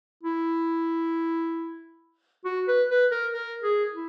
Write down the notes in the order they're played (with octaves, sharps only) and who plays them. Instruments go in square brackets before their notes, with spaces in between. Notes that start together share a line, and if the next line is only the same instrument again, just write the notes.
[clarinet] E4
F#4
B4
B4
A#4
A#4
G#4
E4